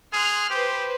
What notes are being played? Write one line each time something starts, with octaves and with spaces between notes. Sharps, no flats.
G#4 C6 F6 F#6
G4 B4 C5